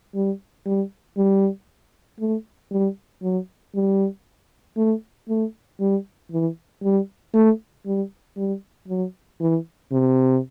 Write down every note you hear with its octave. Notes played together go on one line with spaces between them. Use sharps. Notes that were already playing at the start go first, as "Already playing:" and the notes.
G3
G3
G3
A3
G3
F#3
G3
A3
A3
G3
E3
G3
A3
G3
G3
F#3
E3
C3